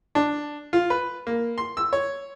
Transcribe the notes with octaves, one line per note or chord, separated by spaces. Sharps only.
D4
F4
B4
A#3
C6
E6
C#5